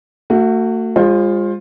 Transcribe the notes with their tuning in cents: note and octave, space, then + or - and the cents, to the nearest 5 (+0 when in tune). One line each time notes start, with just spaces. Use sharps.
A3 +40 F#4 +0
G#3 -35 F4 +10 C5 +25